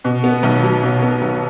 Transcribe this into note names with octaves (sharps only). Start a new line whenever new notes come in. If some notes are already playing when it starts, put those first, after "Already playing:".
B2
B3
B1
F#3
B2
B3
B1